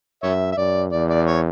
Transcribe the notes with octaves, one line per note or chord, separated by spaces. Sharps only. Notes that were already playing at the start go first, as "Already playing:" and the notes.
F#2 C#5 E5
E5
F#2 D5
E2 D5
D5
C#5